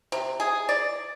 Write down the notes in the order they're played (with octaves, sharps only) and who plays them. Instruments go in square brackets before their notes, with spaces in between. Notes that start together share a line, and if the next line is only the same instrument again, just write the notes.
[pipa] C3
G#4
D5